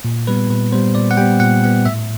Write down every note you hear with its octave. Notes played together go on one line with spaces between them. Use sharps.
A#2
G3 B3 B4
A#2 B4
G3 B3 C5
A#2 D5
F#5
G3 B3 G5
A#2 F#5
G3 B3 F#5
A2 E5